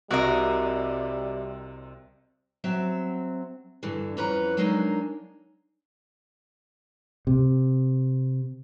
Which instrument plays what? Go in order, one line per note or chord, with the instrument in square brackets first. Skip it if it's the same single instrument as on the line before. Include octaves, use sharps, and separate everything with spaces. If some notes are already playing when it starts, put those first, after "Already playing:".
[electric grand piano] C2 C3 [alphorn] G3 [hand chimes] C4 E5 [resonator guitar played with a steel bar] F#4 A#4 D#5
[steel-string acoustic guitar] F#3 C4 E5
G2 D3 E3
F2 E3 C#4 B4 A#5
F#3 G#3 A#3 D4 D#4
[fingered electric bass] C3